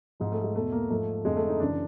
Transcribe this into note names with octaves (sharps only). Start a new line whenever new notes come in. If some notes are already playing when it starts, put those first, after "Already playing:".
G#2 F3 G#3
A3
G#3
E2 B2 A3
A#3
G#2 F3 A3
F2 D3 F3 G#3
A3
D#4
F#2 C#3 E3 D4